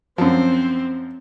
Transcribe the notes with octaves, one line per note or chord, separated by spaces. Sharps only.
F#2 F3 C4